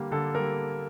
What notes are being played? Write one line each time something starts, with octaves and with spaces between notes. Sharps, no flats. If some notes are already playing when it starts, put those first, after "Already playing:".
Already playing: D3 G3 A#3
D3 A4
G3 A#3 A#4